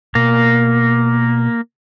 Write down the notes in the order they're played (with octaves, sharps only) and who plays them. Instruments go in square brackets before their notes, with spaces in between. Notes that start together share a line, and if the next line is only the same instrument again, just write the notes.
[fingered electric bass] B2 [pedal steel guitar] A#3